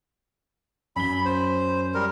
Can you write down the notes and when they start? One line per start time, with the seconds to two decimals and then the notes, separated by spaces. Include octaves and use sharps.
0.96 F#2 B5 G7
1.25 C5
1.94 G3 A#4